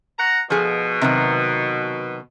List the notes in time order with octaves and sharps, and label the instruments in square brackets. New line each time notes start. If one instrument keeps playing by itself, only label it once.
[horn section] F#5 A#5
[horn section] B2 [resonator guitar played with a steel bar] F3 G#4
[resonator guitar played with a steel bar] C3 D#3 F#3